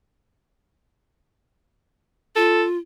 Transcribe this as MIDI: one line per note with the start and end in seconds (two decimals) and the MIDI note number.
2.36 2.78 65
2.36 2.64 69